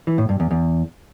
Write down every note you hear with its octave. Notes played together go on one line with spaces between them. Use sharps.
E3
A2
G2
E2
E2